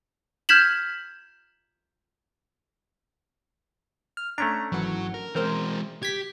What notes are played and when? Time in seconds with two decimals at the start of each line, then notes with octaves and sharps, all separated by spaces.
0.49 F6 G6 G#6 B6 E7 F#7
4.17 F6
4.38 A3 C#4 D4 A#5
4.72 G#1 E3 F#3 F#5
5.14 A#4
5.35 E3 G#3 C4 A#4 C5
6.03 G4 G#6 B6